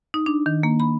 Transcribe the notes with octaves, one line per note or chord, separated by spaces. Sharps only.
D#4
D4
D#3
A#3
B5